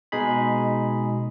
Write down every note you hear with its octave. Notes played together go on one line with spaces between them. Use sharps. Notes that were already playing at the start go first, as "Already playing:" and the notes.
B2 G#3 D#4 G#4 B5